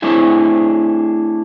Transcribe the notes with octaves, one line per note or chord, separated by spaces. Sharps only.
A3 C4 D4 E4 G#4